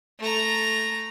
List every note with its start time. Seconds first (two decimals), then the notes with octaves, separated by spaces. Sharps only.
0.20 A3 A#5